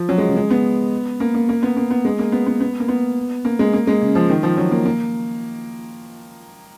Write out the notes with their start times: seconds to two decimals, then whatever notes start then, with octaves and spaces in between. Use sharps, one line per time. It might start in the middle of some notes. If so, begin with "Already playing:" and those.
Already playing: F3
0.09 F#3
0.18 G#3
0.27 C#3
0.36 G#3
0.50 B3
1.20 A#3
1.34 A#3
1.49 A#3
1.63 B3
1.77 A#3
1.91 B3
2.05 G#3
2.19 A#3
2.32 B3
2.47 B3
2.61 B3
2.80 A#3
2.88 B3
3.45 A#3
3.59 G#3
3.73 A#3
3.87 G#3
4.01 C#3
4.15 F3
4.30 D#3
4.43 F3
4.57 F#3
4.71 A#3
4.85 A#3